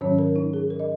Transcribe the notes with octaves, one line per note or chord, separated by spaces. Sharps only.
G#2 D#3 F#3 C#4 C#5
A#4
D#4
G#4
A#4
D#5